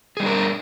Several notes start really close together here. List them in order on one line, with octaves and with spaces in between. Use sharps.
G#4 G3 D4 A#4